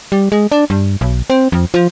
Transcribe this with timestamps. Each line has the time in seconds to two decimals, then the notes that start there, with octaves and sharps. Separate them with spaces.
0.12 G3
0.32 G#3
0.52 D4
0.70 G2
1.01 B1
1.30 C4
1.52 F2
1.74 F3